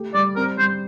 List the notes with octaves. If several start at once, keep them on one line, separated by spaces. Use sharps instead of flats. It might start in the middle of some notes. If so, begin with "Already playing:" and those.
Already playing: A3 G4
G3 D5
C4 A#4
G3 C5